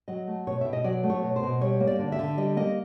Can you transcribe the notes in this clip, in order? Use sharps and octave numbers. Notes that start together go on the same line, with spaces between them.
F#3 D#5
A3
B2 C#5
B2 E5
D#5
F#3 D5
A3
C#5
B2
C5
B2
G3 C#5
A#3
D5
D3
E5
D3
G3 D#5
A#3 D#5